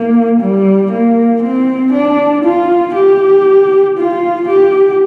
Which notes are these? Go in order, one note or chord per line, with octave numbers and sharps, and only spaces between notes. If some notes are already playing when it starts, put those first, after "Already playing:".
Already playing: A#3
G3
A#3
C4
D4
F4
G4
F4
G4